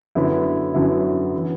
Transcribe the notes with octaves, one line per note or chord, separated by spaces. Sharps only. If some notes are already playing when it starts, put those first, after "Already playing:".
F#2 D3 F#3 B3 E4
F#2 D3 F#3 B3 E4
E3 B3